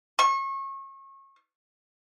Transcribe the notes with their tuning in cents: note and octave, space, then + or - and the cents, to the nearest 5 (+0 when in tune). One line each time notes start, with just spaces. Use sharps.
C#6 -30